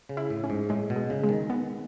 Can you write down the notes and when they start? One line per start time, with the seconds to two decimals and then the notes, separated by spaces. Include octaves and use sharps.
0.09 C#3
0.17 E4
0.30 A2
0.44 C#4
0.50 G#2
0.69 A2 G#3
0.90 B2
0.96 G#3
1.10 C#3
1.23 G#3
1.29 D#3
1.50 B3